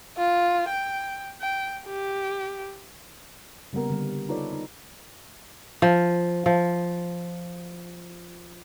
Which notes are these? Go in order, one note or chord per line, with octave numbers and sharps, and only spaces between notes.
F4
G5
G5
G4
C#3 G3 A#3 B3 A#4
D3 G3
D#4 F4 A4 B4 C#5 D5
D#4
F3
F3